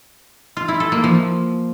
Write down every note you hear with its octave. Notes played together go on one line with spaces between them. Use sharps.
F4
E4
A4
A#3
F3